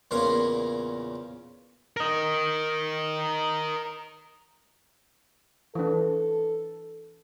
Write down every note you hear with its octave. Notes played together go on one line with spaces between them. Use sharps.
E2 A#2 C#3 A#4 A#5 C6
A#4 D#5
E3 D4 A4